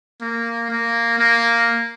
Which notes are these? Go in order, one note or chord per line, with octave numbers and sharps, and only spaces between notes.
A#3
A#3
A#3